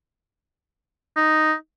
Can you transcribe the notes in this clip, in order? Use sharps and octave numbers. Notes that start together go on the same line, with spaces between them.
D#4